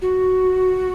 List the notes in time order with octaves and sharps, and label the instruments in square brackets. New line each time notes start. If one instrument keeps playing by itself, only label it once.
[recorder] F#4